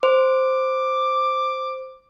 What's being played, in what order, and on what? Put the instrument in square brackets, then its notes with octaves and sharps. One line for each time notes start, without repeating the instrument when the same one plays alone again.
[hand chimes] C5 [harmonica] D6